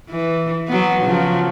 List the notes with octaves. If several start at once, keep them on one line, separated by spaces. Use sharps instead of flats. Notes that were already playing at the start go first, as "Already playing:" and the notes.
E3
F#3 B3
C#3 F3 F#3